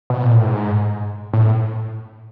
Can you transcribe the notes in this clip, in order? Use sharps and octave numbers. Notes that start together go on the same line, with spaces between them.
B2
A#2
A2
G#2
A2